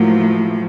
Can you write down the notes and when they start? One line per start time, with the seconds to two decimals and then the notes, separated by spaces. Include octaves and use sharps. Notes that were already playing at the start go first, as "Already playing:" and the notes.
Already playing: A2 F3 F#3 A3 A#3